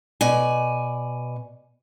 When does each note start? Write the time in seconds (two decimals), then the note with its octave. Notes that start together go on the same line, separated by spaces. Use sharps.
0.21 B2 D5 G#5